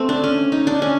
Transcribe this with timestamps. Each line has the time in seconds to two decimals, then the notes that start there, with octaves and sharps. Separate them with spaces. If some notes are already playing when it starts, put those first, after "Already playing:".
Already playing: A3 C4
0.09 D4
0.24 C#4
0.52 D#4
0.67 D4
0.82 C#4